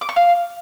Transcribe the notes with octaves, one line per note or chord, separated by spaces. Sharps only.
D6
C#6
F5